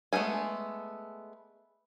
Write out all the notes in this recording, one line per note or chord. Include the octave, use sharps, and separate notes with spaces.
G#3 A3 B3 A#4 G#5